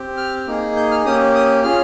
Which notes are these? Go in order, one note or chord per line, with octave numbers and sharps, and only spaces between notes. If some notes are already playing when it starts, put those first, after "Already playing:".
Already playing: C4 G4
F6
A#3 D#4 G#4
G6
F6
A#3 C#4 G4 D#6
D#6
C#4 F4 G#4 F6